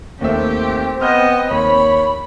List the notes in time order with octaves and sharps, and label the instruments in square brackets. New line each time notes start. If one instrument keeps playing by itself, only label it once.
[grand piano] D#2 A3 E5 [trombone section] C4 [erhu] G4
[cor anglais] B3 [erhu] D#5 [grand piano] F6 G6 A#6
[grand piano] D#2 [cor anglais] C#5 [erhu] B5